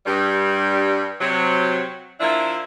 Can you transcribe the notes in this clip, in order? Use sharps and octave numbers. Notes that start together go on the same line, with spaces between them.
G2 G3
C3 F#3
F3 A#3 D4 E4